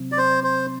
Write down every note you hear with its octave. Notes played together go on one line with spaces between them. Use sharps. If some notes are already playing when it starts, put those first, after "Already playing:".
Already playing: C3 F#3 C4
D5
C5
C5